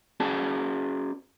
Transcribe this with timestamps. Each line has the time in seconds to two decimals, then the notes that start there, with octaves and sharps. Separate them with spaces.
0.20 C#4 F#4 G#4 D5 A5